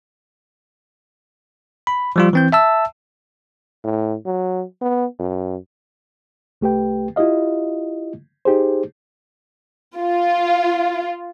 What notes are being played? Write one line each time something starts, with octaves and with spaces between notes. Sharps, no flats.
B5
F3 G3 F4
E3 C4 G6
E5 A5 E6
A2
F#3
B3
F#2
C2 A3 G4 B4 G5
E4 F4 G4 D#5 F5
D#4 G4 G#4 C5
F4